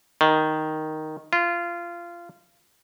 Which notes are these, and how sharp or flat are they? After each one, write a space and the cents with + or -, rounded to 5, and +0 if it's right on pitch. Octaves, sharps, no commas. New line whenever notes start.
D#3 +0
F4 -20